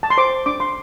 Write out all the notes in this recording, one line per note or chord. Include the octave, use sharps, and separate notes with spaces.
A5
C6
C5 D6
D4 D6
C6